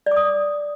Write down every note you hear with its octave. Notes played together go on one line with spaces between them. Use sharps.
D5
D6
D#6